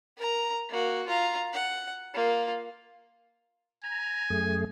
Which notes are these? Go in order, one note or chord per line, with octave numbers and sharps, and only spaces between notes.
A#4 A#5
A#3 F#4
F4 A#5
F#5
A#3 F4
G#5 A#5
F#2 A3 G#4